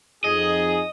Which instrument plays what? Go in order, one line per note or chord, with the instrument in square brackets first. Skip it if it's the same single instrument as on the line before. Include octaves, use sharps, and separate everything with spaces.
[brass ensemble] F2 D#4 G#4 [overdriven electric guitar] D#5